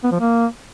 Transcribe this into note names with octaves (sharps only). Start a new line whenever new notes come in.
B3
F3
A#3